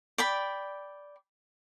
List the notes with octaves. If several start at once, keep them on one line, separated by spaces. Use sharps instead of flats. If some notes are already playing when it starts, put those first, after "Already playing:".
D5 G5 B5